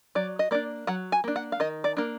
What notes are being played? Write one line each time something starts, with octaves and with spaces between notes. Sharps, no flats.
F#3 D5
D#5
A#3 D4 D5
F#3 F#5
G#5
A#3 D4
F#5
F5
D#3 D#5
D5
A#3 D4